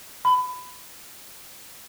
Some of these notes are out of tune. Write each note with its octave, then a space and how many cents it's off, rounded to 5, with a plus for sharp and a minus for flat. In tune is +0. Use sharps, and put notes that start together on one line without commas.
B5 +20